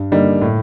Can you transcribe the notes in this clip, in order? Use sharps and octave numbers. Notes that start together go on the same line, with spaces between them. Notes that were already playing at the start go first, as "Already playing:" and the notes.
Already playing: G2
D3 G3 A#3 D#4
A2